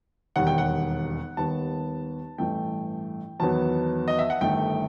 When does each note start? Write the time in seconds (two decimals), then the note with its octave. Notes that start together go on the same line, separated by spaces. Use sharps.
0.36 E1 D#2 D#3 G3 F#5
0.47 G5
0.58 F#5
1.37 D#2 D#3 G3 B3 A5
2.38 A1 G2 E3 A3 G5
3.40 E2 D#3 F#3 B3 A5
4.08 D#5
4.19 E5
4.30 F#5
4.41 G1 G2 D#3 A3 G5